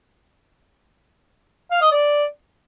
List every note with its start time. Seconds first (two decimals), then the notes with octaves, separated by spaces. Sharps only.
1.71 F5
1.82 D#5
1.92 D5